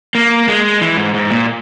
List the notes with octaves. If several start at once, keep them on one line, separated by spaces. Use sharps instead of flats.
A#3
G#3
E3
G#2
G#2
A#2